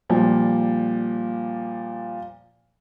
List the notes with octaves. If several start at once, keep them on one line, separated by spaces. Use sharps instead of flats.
A#2 F3 G3